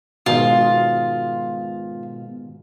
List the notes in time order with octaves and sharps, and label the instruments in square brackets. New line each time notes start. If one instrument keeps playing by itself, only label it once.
[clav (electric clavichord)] G#2 D#3 [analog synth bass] B2 [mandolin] F4